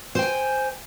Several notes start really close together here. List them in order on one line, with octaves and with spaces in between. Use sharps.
C5 G5 G#5